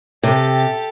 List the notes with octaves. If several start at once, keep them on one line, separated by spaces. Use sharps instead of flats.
C3 G4 A4